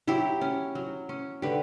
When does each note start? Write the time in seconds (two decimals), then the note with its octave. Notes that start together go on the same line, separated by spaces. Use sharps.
0.07 F#3 E4 G4
0.41 C#4
0.75 F#3
1.09 C#4
1.42 D3 G4 B4